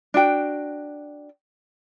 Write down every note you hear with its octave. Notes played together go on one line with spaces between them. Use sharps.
D4 F#4 G5